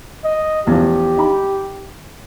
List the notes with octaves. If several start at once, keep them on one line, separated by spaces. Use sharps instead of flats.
D#5
E2 F3 G4
D#4 B5